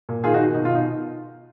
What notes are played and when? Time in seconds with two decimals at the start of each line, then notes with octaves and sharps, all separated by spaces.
0.09 A#2
0.24 D#3 F4 G#4
0.34 D#4 F#4
0.39 D#3
0.54 B2 D#4
0.65 F4
0.69 B2
0.75 D#4